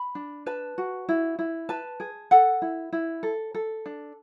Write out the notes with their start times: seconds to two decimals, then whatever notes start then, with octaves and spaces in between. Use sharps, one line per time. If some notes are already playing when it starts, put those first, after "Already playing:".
Already playing: B5
0.15 D4
0.46 B4 A5
0.78 F#4
1.09 E4
1.39 E4
1.69 B4 A5
2.00 G#4
2.31 A4 F#5
2.62 E4
2.93 E4
3.23 A4
3.55 A4
3.86 D4